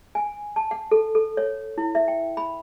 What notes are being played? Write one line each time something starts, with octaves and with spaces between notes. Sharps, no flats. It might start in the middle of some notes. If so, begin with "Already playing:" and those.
G#5
A5
F#5
A4
A4
C#5
E4
E5
G5
B5